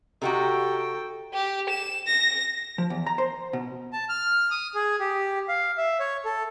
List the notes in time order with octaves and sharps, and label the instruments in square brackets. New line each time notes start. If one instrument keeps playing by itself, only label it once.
[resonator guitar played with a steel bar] C3 D#4 F#4 [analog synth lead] G4 [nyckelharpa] A4 G5
[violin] G4
E7
A#6
[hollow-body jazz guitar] F3
E2
A#5
C5
B2
[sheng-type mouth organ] A5
F6
D#6
G#4
G4
F5
E5
C#5
A4